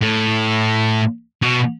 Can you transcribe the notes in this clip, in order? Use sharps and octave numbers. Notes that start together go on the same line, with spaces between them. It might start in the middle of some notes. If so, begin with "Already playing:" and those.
A2
B2